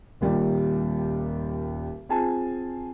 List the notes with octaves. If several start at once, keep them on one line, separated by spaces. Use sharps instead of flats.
D#1 D#2 G3 A#3 F4
C4 F4 G#4 G#5 A5